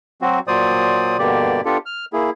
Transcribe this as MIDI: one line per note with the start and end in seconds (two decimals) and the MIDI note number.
0.22 0.40 54
0.22 0.40 60
0.22 0.40 66
0.48 1.17 46
0.48 1.17 54
0.48 1.17 72
0.48 1.17 74
0.48 1.17 87
1.19 1.61 43
1.19 1.61 47
1.19 1.61 50
1.19 1.61 58
1.19 1.61 67
1.19 1.61 74
1.65 1.78 59
1.65 1.78 62
1.65 1.78 65
1.65 1.78 67
1.65 1.78 69
1.86 2.05 89
2.13 2.30 58
2.13 2.30 64
2.13 2.30 68